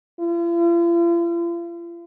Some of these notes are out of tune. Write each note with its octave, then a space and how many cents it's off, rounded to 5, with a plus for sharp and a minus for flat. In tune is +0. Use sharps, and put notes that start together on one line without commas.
F4 -45